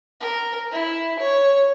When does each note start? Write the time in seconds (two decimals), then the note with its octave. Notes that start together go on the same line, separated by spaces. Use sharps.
0.21 A#4
0.72 E4
1.19 C#5